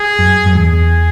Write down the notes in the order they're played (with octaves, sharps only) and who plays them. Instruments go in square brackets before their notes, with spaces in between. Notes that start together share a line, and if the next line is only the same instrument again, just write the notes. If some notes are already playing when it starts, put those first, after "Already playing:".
Already playing: [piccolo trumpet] G#4
[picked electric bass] F#2
F#2
[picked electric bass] E2 [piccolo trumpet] G#4